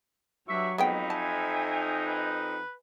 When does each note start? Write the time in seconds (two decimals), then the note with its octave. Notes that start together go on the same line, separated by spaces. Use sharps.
0.49 G2 F#3 D4 E5 C#6
0.78 F2 G#3 B3 D#4 G5 B5
1.10 E5 G#5 A5
2.07 B4